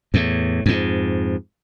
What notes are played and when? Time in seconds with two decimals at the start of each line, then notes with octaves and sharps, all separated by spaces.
0.14 E2 A2
0.66 F2 G#2